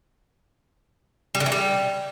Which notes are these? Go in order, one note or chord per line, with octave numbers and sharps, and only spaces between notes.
G3
D3
E3
G3